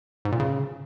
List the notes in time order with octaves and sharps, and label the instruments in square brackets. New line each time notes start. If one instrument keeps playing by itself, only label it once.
[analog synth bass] G#2
A#2
C#3